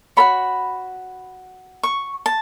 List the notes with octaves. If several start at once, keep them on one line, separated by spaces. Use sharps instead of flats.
F#4 A4 C#5 B5
C#6
A5